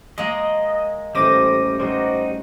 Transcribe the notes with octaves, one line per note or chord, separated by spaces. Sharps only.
G#3 A#3 D#5
A1 G3 C#4 C5 D6 A#6 D#7
G3 D#4 F#4 C5